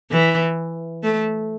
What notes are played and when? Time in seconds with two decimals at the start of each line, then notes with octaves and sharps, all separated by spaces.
0.11 E3
1.03 A3